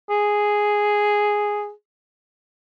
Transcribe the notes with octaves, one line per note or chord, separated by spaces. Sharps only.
G#4